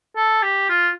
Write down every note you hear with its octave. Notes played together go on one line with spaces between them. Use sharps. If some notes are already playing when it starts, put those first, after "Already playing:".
A4
G4
F4